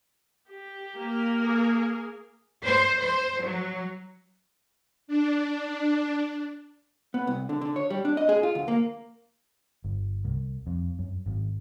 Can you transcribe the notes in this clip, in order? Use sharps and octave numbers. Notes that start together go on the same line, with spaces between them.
G4
A#3 A#4
G#4
C5
C5
F#3
D4
B3
C2
D3
D3
C#5
G3
D4
D#5
G#4
F4
D2
A#3
G1
C2
F2
F#2
G#1